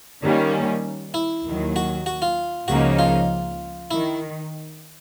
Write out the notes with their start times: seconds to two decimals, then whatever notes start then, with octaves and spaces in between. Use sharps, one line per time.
0.22 D#3 G3 A#3 C#4
1.14 E4
1.45 D#2 D#3 F#3
1.76 F#4
2.06 F#4
2.22 F4
2.68 C#2 C#3 F3 A#3 D#4 F#4
2.99 F4
3.90 D#3 E4